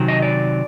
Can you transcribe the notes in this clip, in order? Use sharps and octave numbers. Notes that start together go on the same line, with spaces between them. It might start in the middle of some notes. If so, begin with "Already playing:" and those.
Already playing: C3 D#3 F#3
D#5
D5